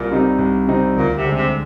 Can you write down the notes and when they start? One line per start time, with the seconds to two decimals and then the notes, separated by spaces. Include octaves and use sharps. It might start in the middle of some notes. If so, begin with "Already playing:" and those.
Already playing: C2 A#2
0.11 C3 G3 C4 D#4
0.39 C2
0.67 C3 G3 C4 D#4
0.96 D2 A#2
1.16 C3
1.24 D3 G#3
1.35 C3